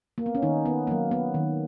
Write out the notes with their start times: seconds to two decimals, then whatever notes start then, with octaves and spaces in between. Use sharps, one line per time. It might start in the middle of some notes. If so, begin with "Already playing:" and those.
0.18 A#3
0.26 B3
0.35 C#4
0.42 D#3 D#4
0.66 B3
0.87 F#3 A#3
1.11 B3
1.34 D#3